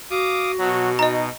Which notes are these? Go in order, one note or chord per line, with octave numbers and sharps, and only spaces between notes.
F#4 F5 D6 D#6
B2 F#3
D#4 D#5 A#5